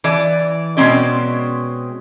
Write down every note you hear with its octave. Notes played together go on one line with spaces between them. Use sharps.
E3 D5
B2 G#3 A#3 C4 C#4 D5